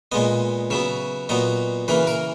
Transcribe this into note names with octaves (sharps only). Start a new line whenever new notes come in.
A#2 G#3 B3 D#5
C#3 F#3 B3 E5
A#2 F#3 B3 D#5
C#3 E3 A#3 B4
A#4